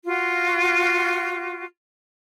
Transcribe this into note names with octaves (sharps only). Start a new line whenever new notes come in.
F4 F#4